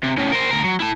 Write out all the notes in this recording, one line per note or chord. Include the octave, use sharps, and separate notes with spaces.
C3
A2 C#3
A#4 C5
D2 A#4
F#3
E4 A5